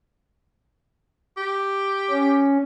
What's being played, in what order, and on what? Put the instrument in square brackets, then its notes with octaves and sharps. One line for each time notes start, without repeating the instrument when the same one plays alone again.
[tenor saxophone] G4
[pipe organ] C#4